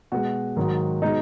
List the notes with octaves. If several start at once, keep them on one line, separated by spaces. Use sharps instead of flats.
B2 G#3 F#4
G#2 D#3 F#3
B2 G#3 D#4